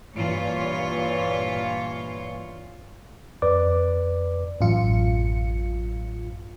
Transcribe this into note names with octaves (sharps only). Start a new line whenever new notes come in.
G2 A#2 E3 F4 C#5
F2 B4 D5 D6
A1 F#2 F4 C#7